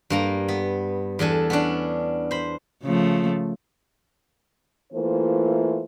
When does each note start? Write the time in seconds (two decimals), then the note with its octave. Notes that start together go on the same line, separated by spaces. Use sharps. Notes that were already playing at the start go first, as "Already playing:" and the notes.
0.10 G2 A#3 A#5
0.48 B3
1.19 E2 D4 A4 G#5
1.50 B3 C#4 D4
2.31 C5 B5
2.83 C#3 F3 A3
4.93 E3 A3 A#3 F4 C5